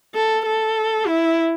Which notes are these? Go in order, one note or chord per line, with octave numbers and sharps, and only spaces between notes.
A4
A4
E4